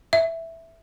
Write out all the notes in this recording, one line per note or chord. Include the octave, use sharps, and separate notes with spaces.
E5